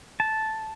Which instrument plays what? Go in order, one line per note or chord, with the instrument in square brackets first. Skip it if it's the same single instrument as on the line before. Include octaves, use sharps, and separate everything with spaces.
[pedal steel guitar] A5